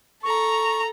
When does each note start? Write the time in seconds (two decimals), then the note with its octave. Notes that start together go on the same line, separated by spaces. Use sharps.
0.23 A4 A#5 C#6